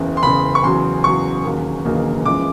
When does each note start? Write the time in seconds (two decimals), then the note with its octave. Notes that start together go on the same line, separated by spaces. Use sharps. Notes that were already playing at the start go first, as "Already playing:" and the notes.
Already playing: F#1 E2 C#3
0.17 C6
0.23 F#1 E2 C#3 B5
0.55 C#6
0.63 E2 C#3 F#3 C6
1.04 E2 C#3 F#3 C#6
1.44 E1 D#2 C#3 F#3 A#3
1.85 E1 D#2 C#3 F#3 A#3
2.26 F#1 E2 C#3 F3 G#3 D6